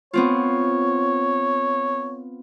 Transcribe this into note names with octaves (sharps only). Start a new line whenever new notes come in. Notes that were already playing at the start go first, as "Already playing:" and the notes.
B3 C4 F4 C#5